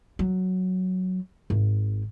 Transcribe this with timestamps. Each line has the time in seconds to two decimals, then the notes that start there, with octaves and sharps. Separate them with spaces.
0.19 F#3
1.50 G#1